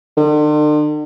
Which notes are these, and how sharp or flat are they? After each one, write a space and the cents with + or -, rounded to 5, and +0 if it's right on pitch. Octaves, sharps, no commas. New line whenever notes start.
D3 +45